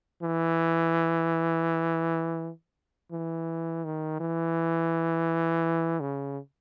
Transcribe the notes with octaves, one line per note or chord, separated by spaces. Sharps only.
E3
E3
D#3
E3
C#3